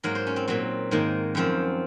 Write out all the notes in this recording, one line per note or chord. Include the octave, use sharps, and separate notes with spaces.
G#2 F#3 A#3 A#4
C5
C#4
C4
A#2 F#3 C4
G#2 D#3 A#3
F#2 F3 C4